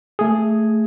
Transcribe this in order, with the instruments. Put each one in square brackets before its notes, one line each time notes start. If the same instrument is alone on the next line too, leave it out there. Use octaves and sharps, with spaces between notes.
[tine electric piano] A3 G#4